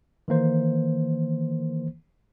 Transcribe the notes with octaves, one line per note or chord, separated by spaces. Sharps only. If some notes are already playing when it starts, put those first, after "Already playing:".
D#3 E3 A#3 C5